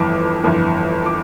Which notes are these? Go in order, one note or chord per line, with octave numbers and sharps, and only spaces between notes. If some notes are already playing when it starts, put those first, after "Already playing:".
Already playing: G1 F2 E3 D6
G1 F2 E3
D6